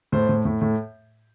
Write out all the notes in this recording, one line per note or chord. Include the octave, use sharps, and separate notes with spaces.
A2 C5
A2
A2
A2